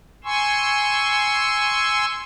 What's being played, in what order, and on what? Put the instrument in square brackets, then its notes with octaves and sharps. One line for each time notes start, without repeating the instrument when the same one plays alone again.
[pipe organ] G#5 C6 C#6 E6